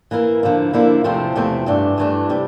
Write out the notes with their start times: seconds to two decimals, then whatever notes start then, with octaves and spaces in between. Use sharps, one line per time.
0.11 E3 A#3 E4 A#4
0.43 D3 F3 A#3 E4
0.73 D3 F3 A#3 E4
1.04 E2 C3 F3 A3 C4
1.35 E2 C3 F3 A3 C4
1.66 G2 E3 A3 D4
1.98 G2 E3 A3 D4
2.29 C3 G3